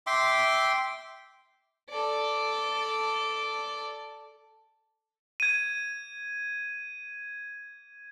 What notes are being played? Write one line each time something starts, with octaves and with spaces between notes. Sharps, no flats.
E5 G5 C6 D6
A4 D5
G#6 D#7